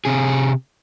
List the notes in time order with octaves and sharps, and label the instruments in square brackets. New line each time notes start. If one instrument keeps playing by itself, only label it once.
[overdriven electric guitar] C3 G#4